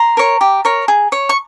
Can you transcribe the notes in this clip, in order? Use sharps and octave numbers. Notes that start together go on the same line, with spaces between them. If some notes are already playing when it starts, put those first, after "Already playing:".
Already playing: A#5 C6
A#4 C#5
G4
A#4 C#5
G#4
C#5
C#6